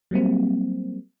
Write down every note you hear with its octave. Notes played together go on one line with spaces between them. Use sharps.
F#3 G3 A#3 C4